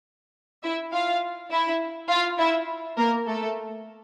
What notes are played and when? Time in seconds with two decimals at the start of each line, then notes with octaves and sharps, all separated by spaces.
0.63 E4 E5
0.93 F4 F5
1.51 E4 E5
2.10 F4 F5
2.38 E4 E5
2.97 A#3 A#4
3.26 A3 A4